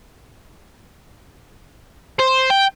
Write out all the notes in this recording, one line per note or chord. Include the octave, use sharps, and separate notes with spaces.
C5
G5